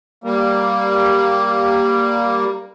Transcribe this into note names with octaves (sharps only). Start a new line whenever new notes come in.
G3 A#3